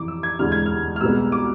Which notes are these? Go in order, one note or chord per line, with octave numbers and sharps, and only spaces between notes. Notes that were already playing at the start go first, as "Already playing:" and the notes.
Already playing: F2 C3 E3 D6
E6
G#6
E1 D2 C3 E3 G#3 F6
G#6
F6
F6
C2 B2 G#3 B3 E6
D6